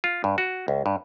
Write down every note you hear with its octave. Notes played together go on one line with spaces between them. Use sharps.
F4
G2
F#4
C#2
G2